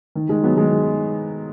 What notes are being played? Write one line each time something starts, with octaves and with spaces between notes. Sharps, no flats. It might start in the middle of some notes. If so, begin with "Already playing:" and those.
D#3
D#3 G#3
F#3 B3
D#3 G#3